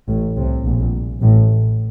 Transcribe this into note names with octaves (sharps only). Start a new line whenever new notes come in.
A1 A2
C2 C3
A#1 A#2
A1 A2